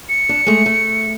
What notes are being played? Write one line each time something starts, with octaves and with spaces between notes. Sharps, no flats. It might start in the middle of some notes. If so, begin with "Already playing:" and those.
C#7
D4
G#3 A3
A3